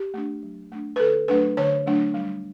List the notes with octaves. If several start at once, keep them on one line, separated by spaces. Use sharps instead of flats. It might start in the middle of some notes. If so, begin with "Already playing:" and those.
Already playing: G4
A3 D4
F#3
A3 D4
B4
D3 A4
F#3 A3 D4 B4
D3 C#5
F#3 A3 D4
G3